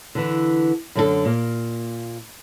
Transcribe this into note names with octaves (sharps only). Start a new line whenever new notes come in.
D3 E3
F#2 D3 D4 F4 A4
A#2 A#3